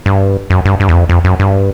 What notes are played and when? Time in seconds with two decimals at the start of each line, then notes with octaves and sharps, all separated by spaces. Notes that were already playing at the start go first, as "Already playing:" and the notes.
0.06 G2
0.50 F#2
0.65 G2
0.80 G2
0.89 E2
0.94 F2
1.09 F2
1.24 F#2
1.39 G2